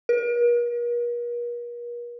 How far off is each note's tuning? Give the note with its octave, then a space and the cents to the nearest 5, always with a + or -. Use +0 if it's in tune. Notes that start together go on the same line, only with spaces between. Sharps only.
A#4 +45